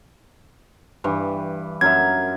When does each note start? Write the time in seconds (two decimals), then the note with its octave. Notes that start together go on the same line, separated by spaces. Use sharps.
1.04 G2 E3
1.81 F#2 A#4 E5 G#6